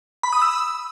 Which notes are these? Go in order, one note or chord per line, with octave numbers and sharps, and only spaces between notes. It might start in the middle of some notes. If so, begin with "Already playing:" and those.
B5
D#6
E6